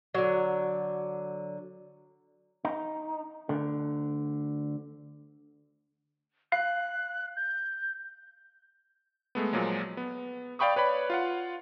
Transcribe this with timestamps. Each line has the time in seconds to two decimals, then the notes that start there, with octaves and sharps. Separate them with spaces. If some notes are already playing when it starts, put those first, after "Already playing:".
0.15 D3 F#3
2.65 D#4
3.49 D2 D3
6.52 F5 F#6
7.36 G6
9.35 G#3 A3 B3
9.53 A#2 F3 F#3 G#3
9.97 B3
10.59 D5 F5 G5 B5 C#6 D#6
10.76 B4 C#5 D5 B5
11.10 F4 F5 F#5